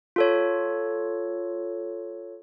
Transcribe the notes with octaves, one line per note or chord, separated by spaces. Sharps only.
F4 A4 C#5